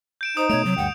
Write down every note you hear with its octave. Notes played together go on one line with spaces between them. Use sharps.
G6 D7 E7
D#4 C5 D#6
B2 A3 C#5 D7 F7
C3 F#3
D2 G2 F#5 G5